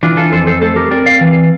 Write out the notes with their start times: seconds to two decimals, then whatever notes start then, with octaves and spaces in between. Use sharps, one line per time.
0.03 E3 D4 F4
0.17 F4 A4
0.32 F2 A4 C5
0.47 A4 C5
0.62 A3 A4 C5
0.76 G4 A#4
0.91 C4 A#4 D5
1.06 D5 F5
1.21 E3